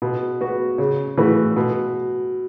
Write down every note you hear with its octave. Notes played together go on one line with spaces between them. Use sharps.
B2
B3 F#4
C#3
E3 A3 F#4 B4
B2